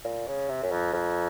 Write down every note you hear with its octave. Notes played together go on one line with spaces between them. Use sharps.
A#2
C#3
C3
F#2
F2
F2